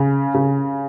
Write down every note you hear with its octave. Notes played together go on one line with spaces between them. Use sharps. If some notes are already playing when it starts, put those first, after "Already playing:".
Already playing: C#3
C#3